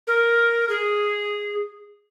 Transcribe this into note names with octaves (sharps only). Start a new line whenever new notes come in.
A#4
G#4